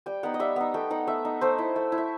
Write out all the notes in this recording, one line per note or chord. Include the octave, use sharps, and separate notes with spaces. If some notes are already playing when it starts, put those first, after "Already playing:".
G3 G5
B3 D#4 F#5
D#5
G3 E5
B3 D#4
A3 G5
D#4 F#5
A3 E5
D#4
A3 C5
E4
A3
E4
E5